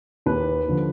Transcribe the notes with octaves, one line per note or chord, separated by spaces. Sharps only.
D#2 B4
D3 F3